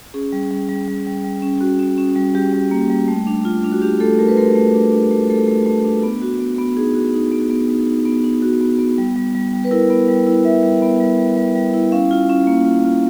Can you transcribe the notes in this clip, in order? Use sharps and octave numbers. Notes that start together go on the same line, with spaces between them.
C#4 G#4
G3
G3
G3
G3
G3
G3
C#4
C#4 F#4
C#4
C#4
G3
G3 G4
G3
A#3
G3
A3
D4
F4
D4
F#4
D4 G4
A3 A4
A3 A#4
B4
A3 A#4
A3
D4
D4
A3
A3 A4
A3
A3
D4
B3
F#4
B3
B3
D#4 G#4
F#4
D#4
B3
B3
D#4
D#4
B3
D#4
F#4
B3
B3
G3
G3
G3
G3
B4
E4 A#4
B3
G3
E4
G3 E5
G3
B3
G3
G3
G3
G3
E4
C#4 F5
F4
C#4
A#3
F4
F4